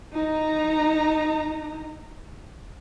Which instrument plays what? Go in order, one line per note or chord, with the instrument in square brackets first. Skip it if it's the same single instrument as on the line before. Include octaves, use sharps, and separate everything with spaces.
[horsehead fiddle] D#4 A#5